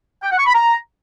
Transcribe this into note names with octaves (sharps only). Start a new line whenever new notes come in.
G5
F#5
C#6
B5
A#5